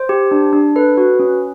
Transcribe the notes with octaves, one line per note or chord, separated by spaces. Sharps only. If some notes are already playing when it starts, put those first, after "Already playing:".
Already playing: C5
G4
D4
D4
A4 B4
F#4
C#4